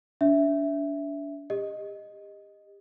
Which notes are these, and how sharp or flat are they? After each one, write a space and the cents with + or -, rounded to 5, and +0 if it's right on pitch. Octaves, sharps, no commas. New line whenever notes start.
D4 -35 E5 +0
G4 +35 D#5 +0